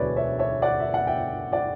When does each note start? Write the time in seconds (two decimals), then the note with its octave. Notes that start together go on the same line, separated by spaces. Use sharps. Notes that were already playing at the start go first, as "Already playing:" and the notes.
Already playing: E1 D2 D3 F#3 B4 C#5 D5 E5
0.16 C#5 E5
0.39 C#5 E5
0.62 D5 F#5
0.80 E5
0.94 F#5
1.07 E5 G5
1.53 D5 F#5